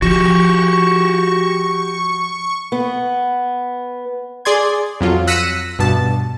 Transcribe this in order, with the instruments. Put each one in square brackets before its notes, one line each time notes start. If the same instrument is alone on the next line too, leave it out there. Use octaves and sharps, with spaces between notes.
[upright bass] F3 [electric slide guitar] F#4 G4 [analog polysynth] C#6
[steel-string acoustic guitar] B3
[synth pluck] G#4 D5 C6 G#6
F2 F#3 F4
E6 F#6 A#6 B6 C#7 D#7
G2 B2 A5